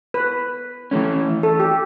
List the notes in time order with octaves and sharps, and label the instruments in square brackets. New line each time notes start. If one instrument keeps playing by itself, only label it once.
[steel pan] B4
[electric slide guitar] E3 A3 C#4
[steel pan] A4
G4